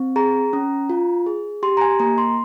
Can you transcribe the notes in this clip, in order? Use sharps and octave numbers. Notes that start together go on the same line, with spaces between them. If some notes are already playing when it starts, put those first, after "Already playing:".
Already playing: C4
G#4 A#5
C#4
F4
G#4
G4 C6
A#5
G#5
A#3 A#5
C6